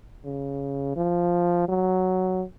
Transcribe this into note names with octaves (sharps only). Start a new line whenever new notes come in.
C#3
F3
F#3